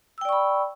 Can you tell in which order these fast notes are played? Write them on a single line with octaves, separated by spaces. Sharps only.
E6 G5 D5 C#6 B5